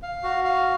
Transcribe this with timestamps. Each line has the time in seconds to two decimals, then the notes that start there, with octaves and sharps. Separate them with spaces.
0.03 F5
0.23 F#4
0.44 F5